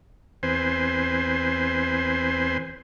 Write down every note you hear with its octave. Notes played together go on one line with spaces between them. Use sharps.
E2 C4 B4 C5 G#5 C6